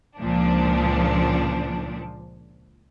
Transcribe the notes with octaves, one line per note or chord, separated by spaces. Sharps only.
C#2 A#2 F3 D4